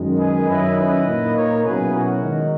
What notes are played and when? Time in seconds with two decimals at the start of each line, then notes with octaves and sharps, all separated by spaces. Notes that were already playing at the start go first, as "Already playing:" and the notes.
Already playing: F#2 D#3 G#3
0.19 G#4 B4
0.48 F#2 D#3 F#3 C#4 E4 B4 D#5
0.76 B4 D#5
1.06 A#2 A#3 D#4
1.35 A#4 C#5
1.64 B2 F#3 C#4 E4 G#4 B4
1.93 F#4 A#4
2.22 D#3 G#3 D#4